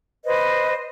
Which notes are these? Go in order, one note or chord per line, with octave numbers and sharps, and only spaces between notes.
B4 C5 D#5